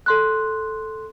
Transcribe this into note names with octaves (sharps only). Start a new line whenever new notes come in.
A4 C6 F#6